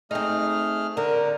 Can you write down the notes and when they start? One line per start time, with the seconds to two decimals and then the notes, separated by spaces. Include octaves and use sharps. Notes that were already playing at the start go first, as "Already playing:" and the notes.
0.11 A3 C4 D#4 G#4 F6
0.97 D3 A#4